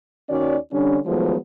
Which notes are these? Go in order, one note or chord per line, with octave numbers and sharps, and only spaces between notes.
D#2 D#3 C#4 F#4 D5
D3 G3 C#4 D4
D#3 F3 F#3 G#3 A3 B3